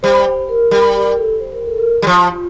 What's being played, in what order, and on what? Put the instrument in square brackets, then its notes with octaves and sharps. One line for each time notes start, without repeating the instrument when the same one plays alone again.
[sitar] G3 [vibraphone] C5
[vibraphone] C5
A#4
[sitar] G3 [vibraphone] A#4
[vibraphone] A#4
A4
C5
A#4
A4
A#4
[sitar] G3
F3
[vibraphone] F4